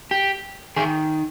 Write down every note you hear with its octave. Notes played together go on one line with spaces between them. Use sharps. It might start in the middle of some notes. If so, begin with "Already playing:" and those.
G4
D#3 G#4